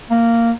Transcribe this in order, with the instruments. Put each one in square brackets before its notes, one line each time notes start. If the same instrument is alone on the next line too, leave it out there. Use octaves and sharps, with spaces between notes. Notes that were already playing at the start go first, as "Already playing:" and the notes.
[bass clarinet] A#3